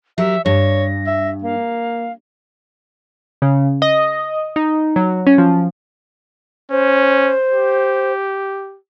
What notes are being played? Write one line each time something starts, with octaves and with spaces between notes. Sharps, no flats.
F#3 G4 A#4 E5
G2 C#5 A#6
E5
A#3 F5
C#3
D#5
D#4
F#3
C#4
F3
C#4 C5
G4